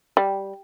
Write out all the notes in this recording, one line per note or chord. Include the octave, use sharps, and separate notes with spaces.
G3